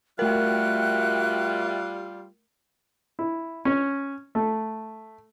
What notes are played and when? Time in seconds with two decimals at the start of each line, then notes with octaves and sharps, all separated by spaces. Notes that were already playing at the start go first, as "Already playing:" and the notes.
0.19 G3 A3 F4 F#4 A#4 E5 G5 F#6
3.19 E4
3.65 C#4
4.35 A3